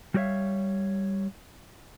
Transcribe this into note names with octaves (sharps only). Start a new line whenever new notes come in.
G3 F#4 G4 C#5 E5 F5